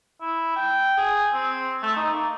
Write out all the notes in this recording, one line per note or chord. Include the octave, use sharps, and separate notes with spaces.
E4
G5
G#4
C4
A3
D#4
A#3